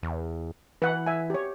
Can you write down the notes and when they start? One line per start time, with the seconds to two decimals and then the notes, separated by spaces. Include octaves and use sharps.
0.03 E2
0.82 E3 B4 F#5
1.06 E5 G#5
1.30 G4 C#5